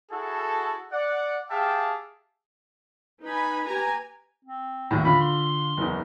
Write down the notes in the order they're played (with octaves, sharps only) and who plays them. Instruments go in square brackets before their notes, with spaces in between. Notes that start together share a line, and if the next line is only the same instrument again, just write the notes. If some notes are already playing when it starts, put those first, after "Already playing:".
[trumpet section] E4 F#4 G#4 A4
D5 F#5
G4 G#4 E5 F5 G5 A5
[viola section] D#4 B4 G#5 B5
G4 B4 G#5 A#5
[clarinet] C4
[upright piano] A#1 D#2 A2
[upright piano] D3 F4 [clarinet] B5
[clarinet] C6
[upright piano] F#1 E2